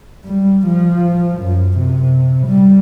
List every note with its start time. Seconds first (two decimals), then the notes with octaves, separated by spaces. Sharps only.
0.25 G3
0.66 F3
1.41 F#2
1.78 C3
2.47 G3